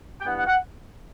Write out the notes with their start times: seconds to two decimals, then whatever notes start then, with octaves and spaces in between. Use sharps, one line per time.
0.21 G5
0.23 G2 E3 B3 F#5
0.36 F#5
0.46 F#5